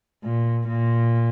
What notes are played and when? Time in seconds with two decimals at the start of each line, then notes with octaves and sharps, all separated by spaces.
0.24 A#2
0.69 A#2